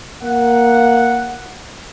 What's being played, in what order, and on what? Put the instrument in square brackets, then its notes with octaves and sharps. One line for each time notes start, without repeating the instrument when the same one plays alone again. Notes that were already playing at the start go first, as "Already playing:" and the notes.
[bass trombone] A#3 [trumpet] F#5